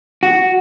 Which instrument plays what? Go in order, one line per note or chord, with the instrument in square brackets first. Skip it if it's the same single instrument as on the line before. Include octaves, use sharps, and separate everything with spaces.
[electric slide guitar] F#4